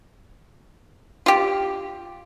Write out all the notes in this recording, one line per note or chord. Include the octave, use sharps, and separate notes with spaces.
F4 G4